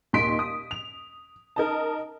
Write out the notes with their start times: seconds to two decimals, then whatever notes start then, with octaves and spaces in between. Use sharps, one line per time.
0.13 D#2 A#2 D#5 C6 B6 D7
0.39 D#6
0.71 F7
1.56 D#4 A#4 D#5 A5